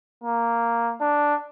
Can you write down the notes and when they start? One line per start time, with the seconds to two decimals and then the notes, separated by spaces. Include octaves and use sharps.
0.24 A#3
1.01 D4